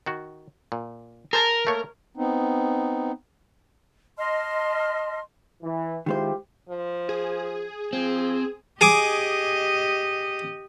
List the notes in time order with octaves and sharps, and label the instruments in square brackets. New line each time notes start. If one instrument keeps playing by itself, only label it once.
[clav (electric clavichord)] D#3 F#4
A#2
[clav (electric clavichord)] G#4 C5 A5 [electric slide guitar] A#4
[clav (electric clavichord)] A3 A#3 C#5
[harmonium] B3 C4 D#4
[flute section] D#5 A5 C6 F6
[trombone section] E3
[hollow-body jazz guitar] D#3 G#3 C5 [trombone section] E4 F4 G4
[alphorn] F3
[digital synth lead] G#4
[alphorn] F3 [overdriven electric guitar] C4
[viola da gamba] G4 D#5 [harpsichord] G#4 G#5 D6